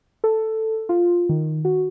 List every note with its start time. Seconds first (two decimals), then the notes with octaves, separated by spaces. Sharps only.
0.24 A4
0.89 F4
1.29 D#3
1.65 F#4